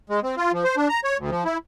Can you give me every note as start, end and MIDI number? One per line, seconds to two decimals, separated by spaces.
0.10 0.20 56
0.23 0.35 60
0.37 0.52 65
0.53 0.64 53
0.64 0.75 72
0.77 0.88 62
0.89 1.00 82
1.04 1.17 73
1.18 1.30 38
1.31 1.44 53
1.45 1.58 64